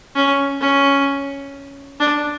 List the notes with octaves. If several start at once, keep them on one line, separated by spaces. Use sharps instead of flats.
C#4
C#4
D4